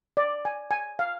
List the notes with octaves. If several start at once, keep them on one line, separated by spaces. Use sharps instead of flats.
D5
G#5
G#5
F5